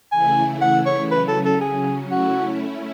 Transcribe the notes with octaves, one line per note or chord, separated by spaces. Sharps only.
C#3 E3 A3 E4 G#5
F#5
C#5
C#3 F#3 C#4 B4
A4
A4
G#4
A3 C#4 E4 F#4